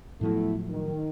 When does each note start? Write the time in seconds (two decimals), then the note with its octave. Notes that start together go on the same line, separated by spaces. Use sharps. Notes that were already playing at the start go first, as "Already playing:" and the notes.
0.21 A2 F3 F#3 A3 B3 E4
0.68 D#3